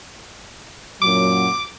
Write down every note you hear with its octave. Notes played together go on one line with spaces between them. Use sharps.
F#2 A#2 F#3 D6